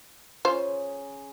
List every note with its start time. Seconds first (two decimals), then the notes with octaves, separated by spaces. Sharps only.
0.45 C#3 F4 G#4 C5